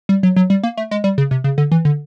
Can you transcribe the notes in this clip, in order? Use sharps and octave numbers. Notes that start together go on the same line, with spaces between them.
G3
F#3
F#3
G3
A#3
A3
G#3
G3
C#3
C3
C#3
D3
E3
D3